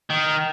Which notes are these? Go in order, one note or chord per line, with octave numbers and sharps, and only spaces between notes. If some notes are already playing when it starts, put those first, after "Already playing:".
D#3